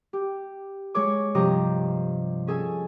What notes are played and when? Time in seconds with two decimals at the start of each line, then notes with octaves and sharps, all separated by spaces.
0.13 G4
0.94 G#3 G#4 C#5 D6
1.34 G2 C3 F3 G4 D#5 A#5
2.47 C#4 G#4 A4 G#5